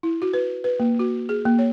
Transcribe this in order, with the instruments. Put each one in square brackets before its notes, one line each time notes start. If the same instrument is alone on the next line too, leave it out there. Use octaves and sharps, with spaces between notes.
[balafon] E4
F#4
B4
B4
A#3
F#4
G#4
A#3
C#5